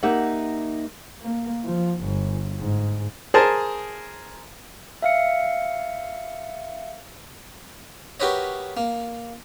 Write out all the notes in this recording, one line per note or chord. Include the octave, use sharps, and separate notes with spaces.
A#3 D#4 G4 E5 F#5
A#3
F3
G1
G#2
G#4 A#4 C5 A5
E5 F5 C#7
F#4 G4 A#4 B4 C#5 D#5
A#3